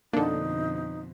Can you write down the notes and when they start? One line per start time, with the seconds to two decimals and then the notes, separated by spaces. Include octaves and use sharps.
0.13 F2 B2 D3 A#3 D4 D#4 A4